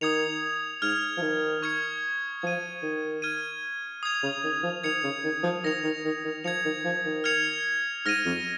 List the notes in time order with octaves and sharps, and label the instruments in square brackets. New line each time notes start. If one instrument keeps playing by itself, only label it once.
[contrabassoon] D#3 [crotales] D#6 G#6 C#7 F7
[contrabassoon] G#2 [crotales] F6 G#6 F7
[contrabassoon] F3
D#3
[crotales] C#6 F6 G#6 C#7
[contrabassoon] F3 [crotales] G#6 D#7
[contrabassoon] D#3
[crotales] F6 G#6 D#7
D#6 G#6 F7
[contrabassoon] C#3
D#3
F3
[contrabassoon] D#3 [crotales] G#6 C#7 F7
[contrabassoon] C#3
D#3
F3
[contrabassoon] D#3 [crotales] D#6 A#6 C#7 F7
[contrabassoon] D#3
D#3
D#3
[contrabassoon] F3 [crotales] G#6 C#7 F7
[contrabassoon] D#3
F3
D#3
[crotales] F6 G#6 C#7 F7
[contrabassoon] G#2 [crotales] F6 A#6 D#7
[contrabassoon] F2